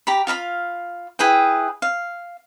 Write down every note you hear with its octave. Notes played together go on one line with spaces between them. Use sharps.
G4 A#5 B5
F4 F5 A#5 B5
E4 G#4 B4 G5
F5